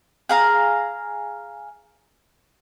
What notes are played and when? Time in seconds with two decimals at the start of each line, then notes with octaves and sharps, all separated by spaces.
0.29 G#4 F5 A#5